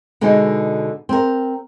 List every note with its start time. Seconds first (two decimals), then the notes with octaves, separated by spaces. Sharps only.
0.21 B2 D3 G#3 D#4
1.09 C4 A#4